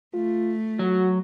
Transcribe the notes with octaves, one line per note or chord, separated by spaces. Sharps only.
A3 F4
F#3 F#4